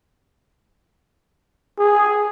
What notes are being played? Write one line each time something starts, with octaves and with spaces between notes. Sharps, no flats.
G#4